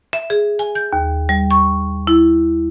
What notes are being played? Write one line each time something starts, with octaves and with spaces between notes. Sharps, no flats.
E5
G#4
G#5
G6
D#2
G3
C#6
E4